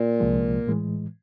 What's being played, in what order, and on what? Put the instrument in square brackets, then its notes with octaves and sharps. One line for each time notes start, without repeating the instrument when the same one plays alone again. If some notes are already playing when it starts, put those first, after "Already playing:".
Already playing: [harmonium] A#2
[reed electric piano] C2 C3 F3 G#3
A2 E3 G#3